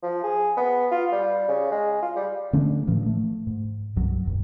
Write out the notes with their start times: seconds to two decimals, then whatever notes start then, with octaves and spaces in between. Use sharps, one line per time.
0.03 F3
0.24 G#4
0.57 B3
0.91 F4
1.12 G3
1.48 C#3
1.72 G#3
2.02 F4
2.16 G3
2.53 D3 A3 C#4 D4
2.87 A2 E3 F3
3.06 A3
3.47 G#2
3.96 C2 G2 F#3
4.26 E1 G2